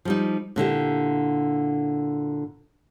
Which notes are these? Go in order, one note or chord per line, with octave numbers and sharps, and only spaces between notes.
F3 G3 D#4
A#2 D3 E4 G4